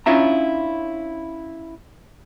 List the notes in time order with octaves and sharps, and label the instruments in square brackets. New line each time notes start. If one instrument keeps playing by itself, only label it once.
[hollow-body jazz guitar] C#4 D4 E4 F4 E5 A#5